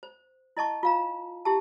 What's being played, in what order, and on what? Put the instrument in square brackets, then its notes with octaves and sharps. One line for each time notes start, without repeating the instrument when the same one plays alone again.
[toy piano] C5
E4 D#5 A5 C#6
F4 F5 A#5
E4 G4 A5